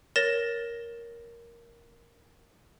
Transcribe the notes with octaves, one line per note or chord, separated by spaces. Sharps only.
A#4 C#5 A6 A#6 E7